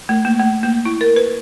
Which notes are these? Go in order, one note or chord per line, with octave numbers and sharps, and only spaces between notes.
A3
A#3
A3
A#3
E4
A#4
B4